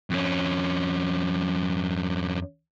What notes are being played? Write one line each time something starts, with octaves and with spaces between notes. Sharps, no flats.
F2 C#4